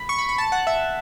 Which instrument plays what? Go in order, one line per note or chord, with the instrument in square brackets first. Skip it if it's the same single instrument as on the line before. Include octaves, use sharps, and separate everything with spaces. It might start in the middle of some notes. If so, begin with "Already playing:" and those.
Already playing: [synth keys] B5
C#6
B5
B5
A5
F#5
E5